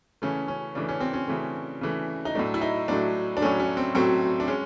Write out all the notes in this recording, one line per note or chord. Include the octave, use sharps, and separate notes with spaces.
C#3 E3 A3 C#4
C#4
C#3 E3 A3 D4
C#4
C4
C#4
C#3 E3 A3
C#3 E3 A3
D#4
A2 F#3 A3 D4
E4
D#4
A2 F#3 A3 D4
D4
A2 F#3 A3 C#4
C#4
C4
A2 F#3 A3 C4
D4
G#3 C#4